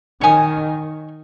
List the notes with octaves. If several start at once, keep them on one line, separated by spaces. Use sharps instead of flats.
D#3 C#5 G#5 D#6